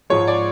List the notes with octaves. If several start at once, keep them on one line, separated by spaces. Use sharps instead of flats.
G#2 F3 G#3 C#5
D5